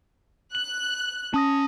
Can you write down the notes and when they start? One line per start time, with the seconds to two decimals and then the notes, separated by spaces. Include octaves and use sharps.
0.55 F#6 F#7
1.34 C#4 A5 D#6 A#6